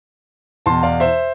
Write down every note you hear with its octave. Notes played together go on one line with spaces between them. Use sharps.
E2 B2 A5 C6
D5 F5
C5 E5